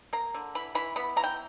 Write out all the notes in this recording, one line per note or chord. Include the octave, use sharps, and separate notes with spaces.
A#3 A#5
D3
E3 B5
E3 B5
B3 B5
E3 A#5
G5